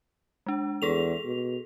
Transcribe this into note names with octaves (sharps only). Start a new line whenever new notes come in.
G#3 D4
E2 G#4 A4 F7
B2